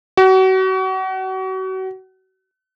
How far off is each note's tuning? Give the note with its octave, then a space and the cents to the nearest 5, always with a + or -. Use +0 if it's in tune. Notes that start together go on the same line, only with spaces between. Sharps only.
F#4 +35